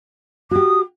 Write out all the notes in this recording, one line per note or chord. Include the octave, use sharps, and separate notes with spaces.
F#4 G4 D#6